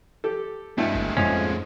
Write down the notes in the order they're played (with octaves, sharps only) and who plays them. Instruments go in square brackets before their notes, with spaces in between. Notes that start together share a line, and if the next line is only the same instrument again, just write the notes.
[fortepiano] G4 A4
[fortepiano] G2 B2 E4 [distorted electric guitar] G#3 A3
[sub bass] G1
[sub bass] F2 [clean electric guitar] G#2 F3 C#4